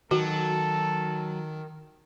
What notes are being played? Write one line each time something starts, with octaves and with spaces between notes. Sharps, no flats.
D#3 F#3 F#4 A4